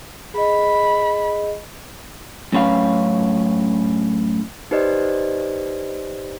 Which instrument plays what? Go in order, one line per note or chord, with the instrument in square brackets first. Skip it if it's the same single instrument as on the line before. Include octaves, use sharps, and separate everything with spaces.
[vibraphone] G#4 D#5 [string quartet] B5
[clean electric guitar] F#2 A2 C#4 B4 F5
[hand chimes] D#4 G4 B4 C5 D5 D#5